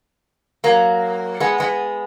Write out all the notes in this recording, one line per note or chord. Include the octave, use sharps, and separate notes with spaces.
F#3 A#3
G#3 B3
G#3 B3